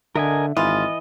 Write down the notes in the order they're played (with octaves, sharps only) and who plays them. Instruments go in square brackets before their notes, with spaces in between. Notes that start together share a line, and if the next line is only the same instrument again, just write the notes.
[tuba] D3 [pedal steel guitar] A#4 D#5 G#5 [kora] E5
[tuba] G#1 [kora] E3 [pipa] F4 [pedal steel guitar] D#5